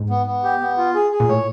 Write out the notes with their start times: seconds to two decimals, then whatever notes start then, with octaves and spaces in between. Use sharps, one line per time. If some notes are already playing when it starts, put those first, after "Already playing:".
Already playing: G#2
0.10 B3
0.26 B3
0.44 G4
0.61 B3
0.77 F4
0.94 G#4
1.12 G#4
1.20 A#2
1.29 A2 C#5